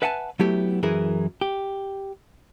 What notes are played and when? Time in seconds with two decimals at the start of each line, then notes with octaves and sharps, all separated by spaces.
0.02 B4 E5 F#5 G#5 A5
0.40 F#3 A3 B3 E4 G4
0.83 F#2 E3 E4 G#4 A#4
1.41 G4